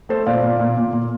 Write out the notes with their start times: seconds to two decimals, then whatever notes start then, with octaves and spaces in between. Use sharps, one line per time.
0.09 A3 A4 C5
0.26 A#2 D5 F5
0.43 A#2
0.60 A#2
0.77 A#2
0.93 A#2